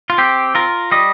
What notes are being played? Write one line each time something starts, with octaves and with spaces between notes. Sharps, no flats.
F4
C4 G4
F4 A#4
G3 D#5